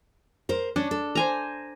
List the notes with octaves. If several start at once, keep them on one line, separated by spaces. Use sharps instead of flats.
A#4 C5
C#4 D4
A4
C5 G#5 A#5